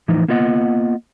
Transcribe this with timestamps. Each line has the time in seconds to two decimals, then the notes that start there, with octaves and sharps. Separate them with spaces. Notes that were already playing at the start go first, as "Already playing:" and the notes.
0.08 A2 E3 F3 D#4
0.28 A#3 B3 F4 D#5 F#5